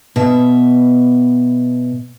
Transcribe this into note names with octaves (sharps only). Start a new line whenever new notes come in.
B2 E5